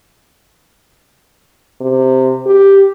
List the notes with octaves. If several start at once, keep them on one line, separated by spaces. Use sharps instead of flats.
C3
G4